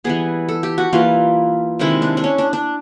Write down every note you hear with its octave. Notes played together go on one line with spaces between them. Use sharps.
E3 G3 B3 G#4
A4
G4
F#4
E3 G3 A#3 F4
C3 D#3 G#3 E4
D4
D4
C#4
D4
D4